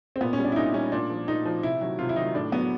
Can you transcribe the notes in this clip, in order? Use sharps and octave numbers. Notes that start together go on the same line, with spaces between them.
C4
A#2 B3
C#4
G3
D4
E4
A#2 D#4
G3 C#4
A#2 D4
F3
A#2 D#4
F3
C3 E4
D#3 F#3
C3 F4
E4
D#3 F#3 D#4
A2 D4
F#3 B3